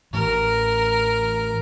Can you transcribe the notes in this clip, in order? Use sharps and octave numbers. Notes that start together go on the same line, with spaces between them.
A2 E3 A#4